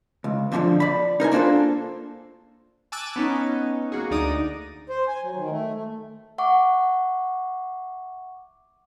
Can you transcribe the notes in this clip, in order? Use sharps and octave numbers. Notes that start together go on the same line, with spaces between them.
C#2
F2 A#2 D3 D#3 F3
D5 B5
D#4 A#4 C5 G#5
A#3 D4 F4 A4 C5
G#5 A5 D6 E6 F#6 A6
B3 C#4 D#4
A#3 F#4 G#4
D2 D#4 D5 D#6
C5
G#5
F#3
D#3
A3
A3
E5 F#5 C#6 D6